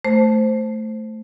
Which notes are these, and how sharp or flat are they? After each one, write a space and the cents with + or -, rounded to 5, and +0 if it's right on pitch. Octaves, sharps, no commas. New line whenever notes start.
A3 +0 C5 +0